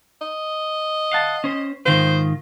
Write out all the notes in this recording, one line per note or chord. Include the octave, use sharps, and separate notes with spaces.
D#5
F5 F#5 A5
C#4 C5
G#2 D#3 F4 C5